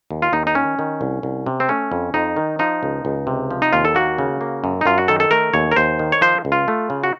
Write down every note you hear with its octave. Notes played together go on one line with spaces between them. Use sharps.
D#2
F4
D#2 D#4
D#4
D#3 C#4
D#3
C2
C2
C3
C4
A3 C#4
F2
F2 D#4
D#3
F3 D#4
C#2
C#2
C3
F3
D#4
D#2 F4
A4
A#3 F#4
C#3
A#3
F#2
D#4
F#2 F4
F#4
D#3 A4
A4
A3 A#4
D#2 C#5
A#4
D#2 C5
D#3
C#5
F3 C5
C#2
F4
A3
C#3
F#4